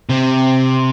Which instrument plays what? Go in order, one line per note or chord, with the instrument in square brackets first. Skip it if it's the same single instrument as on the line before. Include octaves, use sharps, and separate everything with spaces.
[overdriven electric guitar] C3